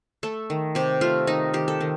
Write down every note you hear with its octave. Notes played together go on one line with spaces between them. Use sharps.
A3 A4
D#3
C3 G4
A3 F4
D#3 D#4
D#3 G4
A4
D#3